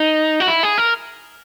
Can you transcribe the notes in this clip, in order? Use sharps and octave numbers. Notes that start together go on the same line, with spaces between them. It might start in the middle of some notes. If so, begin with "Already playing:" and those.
Already playing: D#4
F#4
E4
G#4
A#4